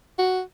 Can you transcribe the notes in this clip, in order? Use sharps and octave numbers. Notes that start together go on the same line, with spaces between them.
F#4